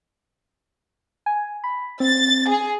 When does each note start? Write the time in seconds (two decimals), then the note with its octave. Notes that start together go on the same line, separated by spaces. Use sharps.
1.26 G#5
1.64 B5
2.00 C4 A6
2.48 G#4